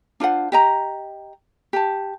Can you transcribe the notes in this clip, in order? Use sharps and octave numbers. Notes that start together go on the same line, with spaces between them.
D4 F4 C5 F#5
G4 D#5 A#5
G4 A5